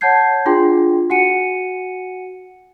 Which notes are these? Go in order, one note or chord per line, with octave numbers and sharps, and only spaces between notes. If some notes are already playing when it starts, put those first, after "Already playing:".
C#5 F#5 A5 G6 G#6 C7
D4 F4 G#4 G5 C6
F#4 F#5 G#5 C#7 D#7